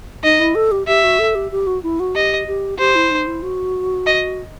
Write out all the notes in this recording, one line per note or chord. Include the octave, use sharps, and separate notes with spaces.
D#4 D#5
E4
A4
G4
G4 E5
F#4
A4
G4
G4
F#4
E4
F#4
G4 D#5
G4
G4 C5
E4
D#4
E4
F#4
D#5